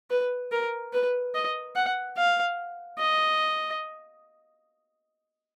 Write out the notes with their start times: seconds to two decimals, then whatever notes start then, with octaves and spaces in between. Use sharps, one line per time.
0.10 B4
0.52 A#4
0.93 B4
1.35 D#5
1.76 F#5
2.17 F5
2.99 D#5